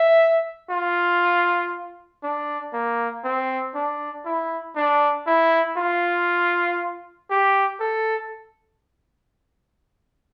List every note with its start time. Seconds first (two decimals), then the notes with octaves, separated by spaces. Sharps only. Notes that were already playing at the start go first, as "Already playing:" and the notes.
Already playing: E5
0.70 F4
2.23 D4
2.73 A#3
3.25 C4
3.75 D4
4.25 E4
4.76 D4
5.27 E4
5.77 F4
7.31 G4
7.80 A4